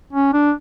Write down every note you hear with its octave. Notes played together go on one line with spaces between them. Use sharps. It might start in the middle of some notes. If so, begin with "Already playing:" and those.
C#4
D4